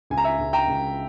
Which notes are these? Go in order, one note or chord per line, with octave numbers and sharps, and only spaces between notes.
C#2 G#5
A#5
E5 G#5
C#2
G5 A#5
C#2